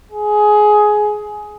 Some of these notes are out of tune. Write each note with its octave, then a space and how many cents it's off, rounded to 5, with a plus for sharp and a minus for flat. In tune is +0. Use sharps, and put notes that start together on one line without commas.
G#4 +15